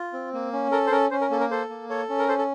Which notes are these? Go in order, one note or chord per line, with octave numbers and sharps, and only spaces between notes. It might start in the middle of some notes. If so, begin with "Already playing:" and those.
Already playing: F4
C4
A#3
C#4
A4 A#4
C5
C#4 A#4
C#4 C5
A#4
A#3 A4
A#4
A4 C5
A#3
A4 C#5
C#4
A#4
A4 C5
A4